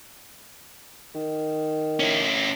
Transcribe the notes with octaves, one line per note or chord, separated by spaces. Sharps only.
D#3
C#4 E4